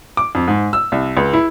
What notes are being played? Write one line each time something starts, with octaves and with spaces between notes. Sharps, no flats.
D6
F2
G#2
E6
C2
C#2
E4